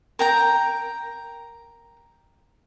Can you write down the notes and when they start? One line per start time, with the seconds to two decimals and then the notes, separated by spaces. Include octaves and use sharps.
0.19 A#4 G5 A#5